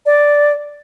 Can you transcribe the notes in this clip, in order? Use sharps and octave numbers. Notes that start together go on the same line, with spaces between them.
D5